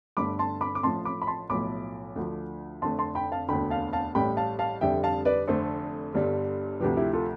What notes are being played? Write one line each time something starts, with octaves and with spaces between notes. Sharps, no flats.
G1 G2 D3 A3 B5 D6
A5 C6
B5 D6
D6
A1 A2 F3 A5 C6
B5 D6
B5
A5 C6
B1 A2 F3 A3 B5 D6
D2 D3 F3
F1 F2 D3 A3 A5 C6
A5 C6
G5 B5
F5 A5
E1 D2 D3 G5 B5
F5 A5
F5 A5
A1 A2 G3 G5 B5
F5 A5
F5 A5
F1 F2 D3 G3 E5 G5
F5 A5
B4 D5
F1 F2 D3 A3 A4 C5
G1 G2 D3 G3
D2 C3 F3 G4 B4
E4 G4
F4 A4